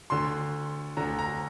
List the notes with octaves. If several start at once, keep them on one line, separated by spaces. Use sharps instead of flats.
D2 D3 C6
D2 D3 A#5
A#5